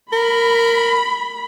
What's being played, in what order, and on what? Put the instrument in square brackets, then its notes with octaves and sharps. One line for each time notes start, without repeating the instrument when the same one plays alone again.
[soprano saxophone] A#4 [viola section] B5